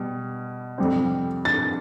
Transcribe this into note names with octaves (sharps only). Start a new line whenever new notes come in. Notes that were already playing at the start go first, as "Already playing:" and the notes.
Already playing: B2 G3
F2 C3 G3 C4
A6